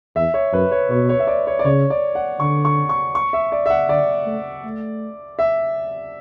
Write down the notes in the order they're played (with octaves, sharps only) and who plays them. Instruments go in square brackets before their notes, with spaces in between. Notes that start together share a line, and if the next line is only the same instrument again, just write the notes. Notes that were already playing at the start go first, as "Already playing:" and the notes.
[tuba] E2 [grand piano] E5
[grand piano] C#5
[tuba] F#2 [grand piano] B4
[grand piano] C#5
[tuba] B2 [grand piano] C#5
[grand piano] C#5
E5
D5
C#5
D5
[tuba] C#3 [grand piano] C#5
[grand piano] D5
F#5
[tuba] D3 [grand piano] C#6
[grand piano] C#6
C#6
C#6
E5
D5
E5
F#5
[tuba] D3 [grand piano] D5
[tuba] A3
A3
[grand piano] E5